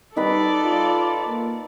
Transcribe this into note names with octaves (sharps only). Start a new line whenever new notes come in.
G3 D#4 A4 B4 D5 B5
F4
A#3